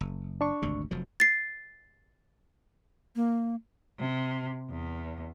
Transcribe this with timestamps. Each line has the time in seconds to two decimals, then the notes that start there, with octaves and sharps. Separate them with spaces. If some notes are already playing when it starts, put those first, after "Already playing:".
0.01 F#1
0.41 D4 C#6
0.62 G#1 D2 C3
0.91 F1 F3 F#3
1.20 A6 C7
3.16 A#3
3.99 C3
4.70 E2